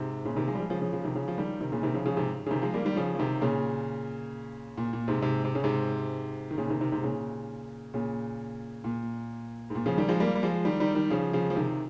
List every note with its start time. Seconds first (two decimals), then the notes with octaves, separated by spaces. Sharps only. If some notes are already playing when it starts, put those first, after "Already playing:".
Already playing: G#2 C3
0.25 A#2 C#3
0.36 C3 D#3
0.47 F3 G#3
0.55 G3
0.59 F3 G#3
0.70 C#3 F3
0.81 C#3 F3
0.93 C#3 F3
1.04 C3 D#3
1.15 C#3 F3
1.28 F3
1.38 D#3 G3
1.60 C3 D#3
1.72 A#2 C#3
1.83 C3 D#3
1.94 C#3 F3
2.06 C#3 F3
2.17 G#2 C3
2.46 C#3
2.51 C3 D#3
2.62 F3 G#3
2.74 G3 A#3
2.85 D#3 G3
2.96 C#3 F3
3.15 F3
3.19 C3 D#3
3.41 A#2 C#3
4.77 A#2
4.93 A#2
5.08 G#2 C3
5.22 G#2 C3
5.45 C3
5.55 C#3
5.64 G#2 C3
6.51 D#3
6.58 A#2 C#3
6.70 C3 D#3
6.81 C3 D#3
6.92 G#2 C3
7.03 A#2 C#3
7.94 A#2 C#3
8.84 A#2
9.70 G#2
9.75 A#2
9.86 C#3 F3
9.98 D#3 G3
10.09 F3 G#3
10.20 G3 A#3
10.36 G3
10.43 F3 G#3
10.65 D#3 G3
10.80 D#3 G3
10.95 D#3 G3
11.10 C#3 F3
11.33 C#3 F3
11.50 F3
11.56 C3 D#3